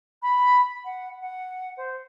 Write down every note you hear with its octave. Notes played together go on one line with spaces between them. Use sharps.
B5
F#5
F#5
C5